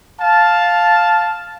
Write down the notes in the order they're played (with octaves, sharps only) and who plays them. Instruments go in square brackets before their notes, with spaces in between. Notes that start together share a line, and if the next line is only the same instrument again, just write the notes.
[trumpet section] F5 A5